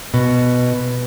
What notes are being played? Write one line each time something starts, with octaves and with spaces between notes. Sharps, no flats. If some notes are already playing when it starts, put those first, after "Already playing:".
B2